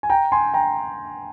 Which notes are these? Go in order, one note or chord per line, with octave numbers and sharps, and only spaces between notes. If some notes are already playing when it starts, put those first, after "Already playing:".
G#5
G5 A#5
G#5 C6
G5 A#5